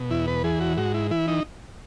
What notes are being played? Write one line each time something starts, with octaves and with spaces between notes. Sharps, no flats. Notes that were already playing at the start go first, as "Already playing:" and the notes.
Already playing: B2
E2 E4
B4
E3 G#4
F#4
G#2 F#4
E4
E3 E4
D#4